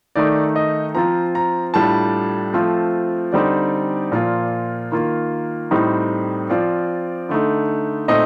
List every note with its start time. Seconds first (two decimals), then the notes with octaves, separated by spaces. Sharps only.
0.16 D#3 A3 D#4 D5
0.56 D#5
0.95 F3 C4 F4 A#5
1.35 A#5
1.74 A2 G3 D4 F4 A5
2.54 F3 A3 C4 F4
3.32 D3 G3 C4 D#4 D5
4.12 A#2 F3 A#3 F4
4.92 D#3 A#3 F4
5.71 A2 G3 C4 D#4
6.50 F3 C4 F4 D5
7.29 D3 A3 D#4
8.08 A#2 A3 C4 D#4 D#5